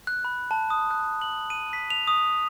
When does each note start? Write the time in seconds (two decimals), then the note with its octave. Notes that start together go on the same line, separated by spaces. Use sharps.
0.07 F#6
0.25 B5
0.51 A5
0.70 D#6
0.91 F#6
1.22 F#7
1.50 D#7
1.73 B6
1.90 F7
2.07 D#6